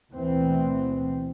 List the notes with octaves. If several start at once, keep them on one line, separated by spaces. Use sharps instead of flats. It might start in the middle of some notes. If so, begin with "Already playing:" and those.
D2 B2 E3 C4